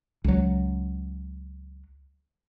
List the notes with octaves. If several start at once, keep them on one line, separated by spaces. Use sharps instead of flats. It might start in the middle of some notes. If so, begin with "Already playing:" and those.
C#2 F#3